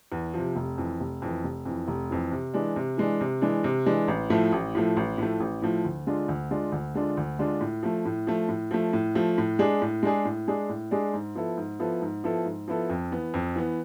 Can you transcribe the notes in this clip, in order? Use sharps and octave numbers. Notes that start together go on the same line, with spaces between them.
E2
C3 F3
F1
F2 E3
F1
F2 E3
F1
F2 E3
F1
F2 E3
C3
E3 G#3 D4
C3
E3 G#3 D4
C3
E3 G#3 D4
C3
E3 G#3 D4
A1
A2 F3 A3
A1
A2 F3 A3
A1
A2 F3 A3
A1
A2 F3 A3
D2
D3 G#3 D4 F4
D2
D3 G#3 D4 F4
D2
D3 G#3 D4 F4
D2
D3 G#3 D4 F4
A2
F3 A3
A2
F3 A3
A2
F3 A3
A2
F3 A3
A2
G#3 D4 G#4
A2
G#3 D4 G#4
A2
G#3 D4 G#4
A2
G#3 D4 G#4
G#2
F3 B3 E4 A4
G#2
F3 B3 E4 A4
G#2
F3 B3 E4 A4
G#2
F3 B3 E4 A4
F2
E3 B3
F2
E3 B3